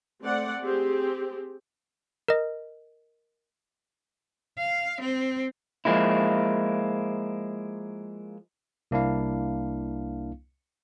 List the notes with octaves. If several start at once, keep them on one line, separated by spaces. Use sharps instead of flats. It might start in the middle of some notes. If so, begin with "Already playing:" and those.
A3 C4 D5 F#5
C4 G4 G#4
A#4 D#5
F5
C4
F3 G#3 A#3 E4
C2 A#3 D4 E4 F5